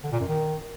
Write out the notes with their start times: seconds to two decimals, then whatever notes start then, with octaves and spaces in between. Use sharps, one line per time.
0.04 D3
0.12 A#2
0.20 F#2
0.28 D#3